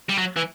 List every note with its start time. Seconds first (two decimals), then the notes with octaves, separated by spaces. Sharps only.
0.09 G3
0.18 F#3
0.37 E3